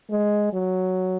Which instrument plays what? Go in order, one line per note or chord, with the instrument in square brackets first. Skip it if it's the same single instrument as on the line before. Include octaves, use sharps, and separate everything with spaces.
[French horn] G#3
F#3